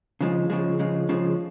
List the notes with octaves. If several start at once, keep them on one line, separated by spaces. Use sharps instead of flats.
C#3 F3 G#3
C#3 F3 G#3
C#3 F3 G#3
C#3 F3 G#3